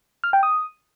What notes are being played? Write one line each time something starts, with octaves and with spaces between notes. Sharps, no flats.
F6
G5
D#6